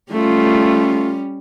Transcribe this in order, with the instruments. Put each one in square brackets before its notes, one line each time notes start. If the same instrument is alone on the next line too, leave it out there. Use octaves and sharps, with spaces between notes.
[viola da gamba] G3 C#4 [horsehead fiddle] A3 F4